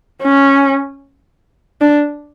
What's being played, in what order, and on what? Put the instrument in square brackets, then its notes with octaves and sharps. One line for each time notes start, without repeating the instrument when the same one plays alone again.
[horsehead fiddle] C#4
D4